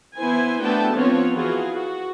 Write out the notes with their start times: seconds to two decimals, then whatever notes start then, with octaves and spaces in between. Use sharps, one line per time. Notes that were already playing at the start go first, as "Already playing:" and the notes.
0.16 E3 B3 E4 C5 G#5
0.61 A3 B3 D4 F#4 G5 A5
0.95 F3 B3 C4 F4 C#5
1.34 E3 F4 F#4 G#4
1.73 F#4